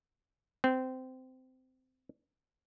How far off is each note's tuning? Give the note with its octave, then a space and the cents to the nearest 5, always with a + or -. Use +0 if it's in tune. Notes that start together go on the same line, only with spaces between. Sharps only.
C4 -20